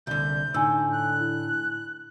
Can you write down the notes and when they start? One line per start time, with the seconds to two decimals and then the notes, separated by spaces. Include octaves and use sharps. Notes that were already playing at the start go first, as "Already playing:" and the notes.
0.07 C2 D3 G6
0.54 A2 D3 D#4 G#5 E6
0.92 F#6
1.20 E4